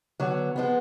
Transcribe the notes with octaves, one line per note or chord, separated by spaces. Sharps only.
D3 F#3 B3
F3 G#3 B3